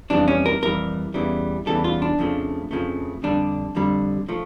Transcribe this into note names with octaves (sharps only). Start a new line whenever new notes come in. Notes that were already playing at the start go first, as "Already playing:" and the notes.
F2 E3 G3 D4
C#4
A#4
F2 E3 G3 A#4
E2 C#3 E3 G3
E2 C#3 E3 G3 A4
F4
D4
F2 C#3 F3 A3
F2 C#3 F3 A3
F2 D3 G3 D4
F2 D3 G3
F3 A3